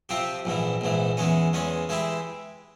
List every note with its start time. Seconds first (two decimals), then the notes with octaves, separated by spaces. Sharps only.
0.09 C3 F3 C4 G4
0.45 A#1 G#2 E3
0.81 A#1 G#2 E3
1.17 E2 E3 G#3 C#4
1.53 E2 E3 G#3 C#4
1.89 E3 G#3 E4 G4